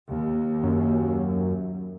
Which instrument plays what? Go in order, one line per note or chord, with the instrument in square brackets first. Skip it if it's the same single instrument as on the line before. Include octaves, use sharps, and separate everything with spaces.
[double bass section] D#2
[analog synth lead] F#2